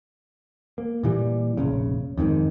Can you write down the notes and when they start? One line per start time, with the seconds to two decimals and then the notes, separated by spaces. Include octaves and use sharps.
0.78 A#3
1.03 A#2 E3 G3
1.57 F1 A#1 C#3
2.18 F2 G#2 B2 D#3